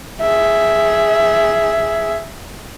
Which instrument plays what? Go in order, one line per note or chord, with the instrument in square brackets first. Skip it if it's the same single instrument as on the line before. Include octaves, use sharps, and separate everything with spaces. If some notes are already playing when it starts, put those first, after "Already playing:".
[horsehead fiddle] G#4 E5